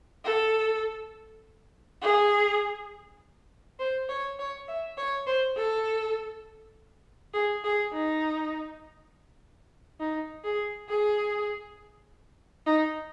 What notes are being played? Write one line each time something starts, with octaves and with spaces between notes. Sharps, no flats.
A4
G#4
C5
C#5
C#5
E5
C#5
C5
A4
G#4
G#4
D#4
D#4
G#4
G#4
D#4